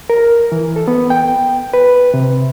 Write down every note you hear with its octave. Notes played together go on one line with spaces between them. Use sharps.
A#4
E3
A4
B3
G5
B4
C3